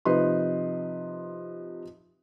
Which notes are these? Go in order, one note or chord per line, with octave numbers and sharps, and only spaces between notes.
C3 F3 D#4 B4 C6